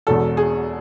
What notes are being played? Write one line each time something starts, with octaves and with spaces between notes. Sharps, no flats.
E1 E2 B2 A4
G#4